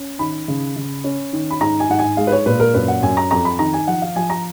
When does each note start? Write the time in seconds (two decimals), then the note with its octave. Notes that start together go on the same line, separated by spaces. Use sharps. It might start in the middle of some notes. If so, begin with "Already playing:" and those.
Already playing: C#4
0.19 D#3 B5
0.48 C#3
0.76 C#3
1.04 C#4
1.33 D#3
1.51 B5
1.61 G#2 A#5
1.80 G#5
1.90 G#2 F#5
1.99 G#5
2.17 G#3 F5
2.27 B4
2.32 C#5
2.46 A#2 B4
2.60 A#4
2.74 F#2 B4
2.88 F#5
3.03 F#2 G#5
3.17 A#5
3.31 F2 A#5
3.45 B5
3.59 D#3 A#5
3.73 G#5
3.87 F3 F#5
4.02 F5
4.16 F3 G#5
4.30 A#5